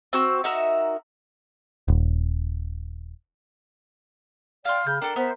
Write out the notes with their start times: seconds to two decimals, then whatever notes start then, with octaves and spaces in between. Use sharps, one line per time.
0.13 C4 F#4 E6
0.44 D#4 F#4 A#4 E5
1.88 D#1
4.65 D5 F5 G5 C6 F6
4.87 C#3 B5 G6
5.02 D4 A4 A#4 D5 G5
5.16 B3 C5 E5